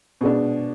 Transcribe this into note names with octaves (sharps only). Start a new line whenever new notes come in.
B2 G#3 D4